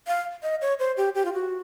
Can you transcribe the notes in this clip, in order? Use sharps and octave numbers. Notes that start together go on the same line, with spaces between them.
F5
D#5
C#5
C5
G4
G4
F4
F#4